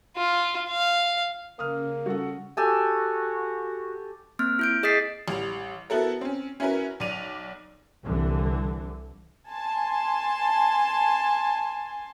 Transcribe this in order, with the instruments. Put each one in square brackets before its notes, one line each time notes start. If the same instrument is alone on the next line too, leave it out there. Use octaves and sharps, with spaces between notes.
[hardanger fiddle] F4
F5
[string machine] C#3 [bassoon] A#3 [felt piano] D#6 F6
[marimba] G3 C#4 [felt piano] F#4 A4 F#5
[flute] F#4 [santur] G4 A4 G#5
[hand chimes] A#3 C4 F6
E4 G6 D7
G#4 D#5 D#6 A6 B6 C7
[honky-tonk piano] A1 G3 F7
B3 E4 F#4 A4 A#4
C4 C#4
C#4 E4 F#4 A#4 B4
B1 D5 D#7 F7
[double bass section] C2 D3 E3
[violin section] G#5 A5 C6